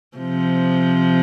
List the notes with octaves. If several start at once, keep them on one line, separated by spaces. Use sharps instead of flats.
C3 F3